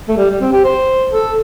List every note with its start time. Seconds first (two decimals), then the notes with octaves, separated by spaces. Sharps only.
0.08 A3
0.17 G3
0.30 G3
0.41 C4
0.52 G4
0.64 C5
1.12 A4